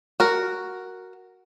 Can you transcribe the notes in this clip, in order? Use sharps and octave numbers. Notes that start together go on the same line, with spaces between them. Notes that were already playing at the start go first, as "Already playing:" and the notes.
F#4 A#4